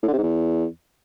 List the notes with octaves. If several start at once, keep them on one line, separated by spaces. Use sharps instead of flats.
A2
D3
C3
G#2
E2